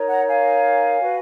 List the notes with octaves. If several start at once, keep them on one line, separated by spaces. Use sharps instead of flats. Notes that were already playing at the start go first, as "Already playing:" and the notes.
Already playing: D#4 A#4 C#5
F#5 A#5
F5 G#5
F#4 B4